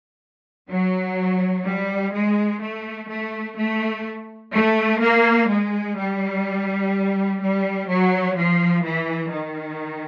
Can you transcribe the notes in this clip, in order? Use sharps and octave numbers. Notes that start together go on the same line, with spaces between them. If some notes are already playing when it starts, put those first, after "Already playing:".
F#3
G3
G#3
A3
A3
A3
A3
A#3
G#3
G3
G3
F#3
F3
E3
D#3